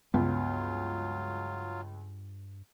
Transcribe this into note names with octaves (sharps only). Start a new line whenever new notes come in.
C#2 G2 F#3 B3 F4